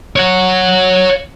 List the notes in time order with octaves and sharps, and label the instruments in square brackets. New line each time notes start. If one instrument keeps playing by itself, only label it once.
[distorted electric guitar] C#5 F#5